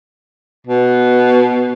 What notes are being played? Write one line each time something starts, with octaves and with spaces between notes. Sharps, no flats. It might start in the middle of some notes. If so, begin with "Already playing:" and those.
B2